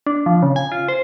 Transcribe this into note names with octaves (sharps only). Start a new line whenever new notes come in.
D4
F3
C#3
G#5
F4
C5